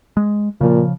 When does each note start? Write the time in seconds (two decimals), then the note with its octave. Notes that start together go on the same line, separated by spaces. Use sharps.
0.17 G#3
0.61 A#2 C#3 F3